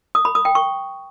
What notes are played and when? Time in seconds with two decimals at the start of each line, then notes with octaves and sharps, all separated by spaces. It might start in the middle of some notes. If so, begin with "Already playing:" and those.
0.15 D#6
0.25 B5
0.35 D#6
0.45 G5
0.55 C#6